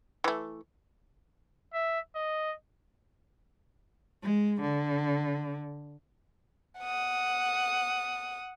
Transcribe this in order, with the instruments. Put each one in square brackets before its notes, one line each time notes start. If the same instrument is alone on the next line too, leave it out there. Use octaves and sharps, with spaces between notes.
[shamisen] E3 A3
[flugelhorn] E5
D#5
[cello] G#3
D3
[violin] F#5 D#6